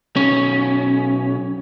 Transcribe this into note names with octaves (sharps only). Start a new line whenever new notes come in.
B1 C#4